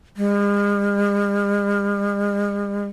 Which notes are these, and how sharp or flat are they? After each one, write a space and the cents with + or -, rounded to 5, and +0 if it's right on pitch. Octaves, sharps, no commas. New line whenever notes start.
G#3 -45